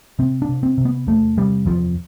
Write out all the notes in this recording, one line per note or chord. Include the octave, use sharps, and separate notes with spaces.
C3 C4
D4
C3
C4
C3
B3
E2 A3
C3 G3
E2 F3